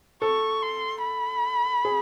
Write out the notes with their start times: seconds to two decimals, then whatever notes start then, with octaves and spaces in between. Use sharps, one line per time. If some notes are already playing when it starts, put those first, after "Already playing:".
0.22 A4 C#6
0.62 C6
1.03 B5
1.85 G#4